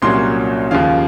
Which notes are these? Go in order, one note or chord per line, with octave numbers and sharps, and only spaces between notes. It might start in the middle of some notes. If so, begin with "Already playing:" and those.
C2 A#2 F#3 C#4 C6
D#2 C#3 F3 F5